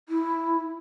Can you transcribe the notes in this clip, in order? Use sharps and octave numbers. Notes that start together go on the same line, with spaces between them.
E4